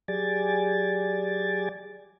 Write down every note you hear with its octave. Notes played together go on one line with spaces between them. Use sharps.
F#3 G4 G#4 D5 G#5 A6